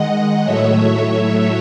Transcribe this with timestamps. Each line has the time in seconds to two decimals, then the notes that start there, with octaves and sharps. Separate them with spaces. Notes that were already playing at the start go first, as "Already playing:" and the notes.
Already playing: D#3 G#3 D#5 F#5
0.43 A2 F#3 A3 C#5 E5